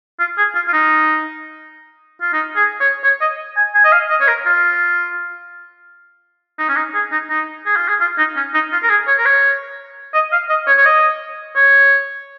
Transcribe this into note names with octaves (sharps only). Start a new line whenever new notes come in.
F4
G#4
F4
F4
D#4
F4
D#4
G#4
C#5
C#5
D#5
G#5
G#5
D#5
F5
D#5
C#5
A#4
F4
D#4
C#4
D#4
G#4
D#4
D#4
G#4
F4
G#4
F4
D#4
C#4
D#4
F4
A#4
G#4
C#5
A#4
C#5
D#5
F5
D#5
C#5
C#5
D#5
C#5